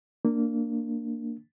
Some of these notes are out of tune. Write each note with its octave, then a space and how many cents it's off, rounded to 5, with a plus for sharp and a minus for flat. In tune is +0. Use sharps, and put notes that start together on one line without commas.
A#3 -10 D4 +5